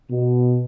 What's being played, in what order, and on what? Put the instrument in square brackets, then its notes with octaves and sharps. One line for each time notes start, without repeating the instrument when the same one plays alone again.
[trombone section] B2